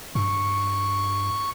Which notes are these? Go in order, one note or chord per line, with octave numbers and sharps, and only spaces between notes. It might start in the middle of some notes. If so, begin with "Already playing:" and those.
G2 C#6